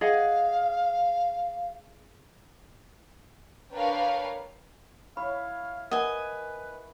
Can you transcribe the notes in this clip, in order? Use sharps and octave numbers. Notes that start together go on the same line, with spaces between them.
G#4 D#5 F5 F#5
D4 A#4 B4 C#5 F5 G5
E4 C#5 F5 B5
A#4 B4 D#5 F#5 G#5